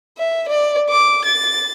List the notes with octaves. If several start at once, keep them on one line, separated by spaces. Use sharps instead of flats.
E5
D5
D6
A6